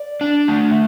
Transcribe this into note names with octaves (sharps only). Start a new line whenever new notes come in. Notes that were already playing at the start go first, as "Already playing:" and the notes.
Already playing: D5
D4
A3